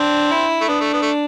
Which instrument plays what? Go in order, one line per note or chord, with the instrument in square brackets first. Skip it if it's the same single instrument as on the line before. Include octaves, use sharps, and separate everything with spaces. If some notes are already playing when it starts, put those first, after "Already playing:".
Already playing: [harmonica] C4 [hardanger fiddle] D4
[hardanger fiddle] E4
[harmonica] A3
[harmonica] B3 [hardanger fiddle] D4
[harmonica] A3
B3
A3